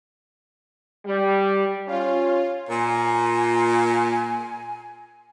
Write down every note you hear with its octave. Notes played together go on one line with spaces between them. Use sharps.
G3
C#4 F4
A#2 G#5